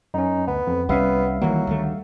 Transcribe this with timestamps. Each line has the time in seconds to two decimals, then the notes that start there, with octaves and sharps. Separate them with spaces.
0.14 F#2 C#4 D#4
0.48 D2 B3
0.67 F2
0.89 C2 G3 B3 C#4 E5 F5
1.41 D#3 E3 F#3 A#3
1.67 D2 D#3 A3